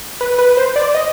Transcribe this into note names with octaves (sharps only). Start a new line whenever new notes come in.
B4
B4
C5
D5
D#5